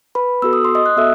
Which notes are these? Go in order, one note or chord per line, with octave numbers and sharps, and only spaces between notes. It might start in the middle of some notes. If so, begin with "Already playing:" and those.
B4 B5
B3 F#4 A4 E6
D#6
C6
D#5 D#6
F#6
B3 F#4 A4 E5 E6